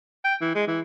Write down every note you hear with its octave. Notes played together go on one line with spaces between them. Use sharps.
G5
E3
G#3
E3